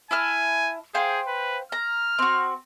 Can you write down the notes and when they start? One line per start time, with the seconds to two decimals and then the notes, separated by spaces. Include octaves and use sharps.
0.11 E4 G#5 A5 F6
0.94 G#4 C5 F5 G5
1.27 B4
1.72 A#5 F6
2.19 C4 F#4